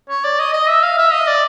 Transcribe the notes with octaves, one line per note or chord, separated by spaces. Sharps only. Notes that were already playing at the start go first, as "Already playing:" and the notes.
C#5
D5
D#5
D#5
E5
F5
E5
D#5
D5